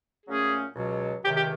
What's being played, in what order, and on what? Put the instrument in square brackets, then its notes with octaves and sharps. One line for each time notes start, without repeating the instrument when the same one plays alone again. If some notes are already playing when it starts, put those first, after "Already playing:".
[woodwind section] A#2 F#3 A3 C#4 [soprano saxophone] G#4
[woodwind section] C#2 B2 F#3
[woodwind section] C#2 C3 D#3 [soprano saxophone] G4
[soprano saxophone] G4